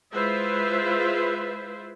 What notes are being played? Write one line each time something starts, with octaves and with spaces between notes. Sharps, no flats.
G#3 E4 F4 B4 C5 E5